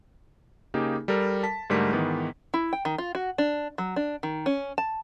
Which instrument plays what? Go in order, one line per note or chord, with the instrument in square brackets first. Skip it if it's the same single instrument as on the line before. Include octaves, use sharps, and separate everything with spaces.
[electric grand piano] C#3 A#3 D#4 G4 G#4
G3 A4 A#4
A5 B6
G#2 D3 G3 A3 A#4 B6
G#2 D#3 E3 B3
[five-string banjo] E4
G5
D#3
F4
F#4
D4
F#3
D4
D#3
C#4
A5